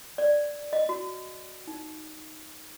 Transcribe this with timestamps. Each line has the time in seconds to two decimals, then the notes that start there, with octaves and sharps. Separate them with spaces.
0.18 D5
0.73 D#5
0.89 F#4
1.67 D#4